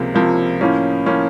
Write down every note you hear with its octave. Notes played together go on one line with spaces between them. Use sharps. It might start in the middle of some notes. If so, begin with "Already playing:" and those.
Already playing: C#2 C3 F3 A#3
C#2 C3 F3 A#3
A2 F3 A#3 C#4
A2 F3 A#3 C#4